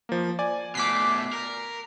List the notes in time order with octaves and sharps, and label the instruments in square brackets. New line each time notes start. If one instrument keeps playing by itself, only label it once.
[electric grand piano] F3 A#3
D5 G#5
[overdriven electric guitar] B2 A3 [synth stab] D6 B6 C7
[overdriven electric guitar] A#4